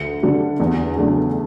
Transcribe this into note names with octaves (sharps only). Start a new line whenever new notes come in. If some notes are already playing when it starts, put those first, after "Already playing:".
Already playing: D2 C#7
D3 G3 D4
E2
C#3 F#3 A3 D4